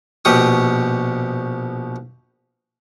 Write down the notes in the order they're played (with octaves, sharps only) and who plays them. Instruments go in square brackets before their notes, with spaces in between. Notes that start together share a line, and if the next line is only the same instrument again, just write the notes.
[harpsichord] A#1 B2 G4 C#6 D#6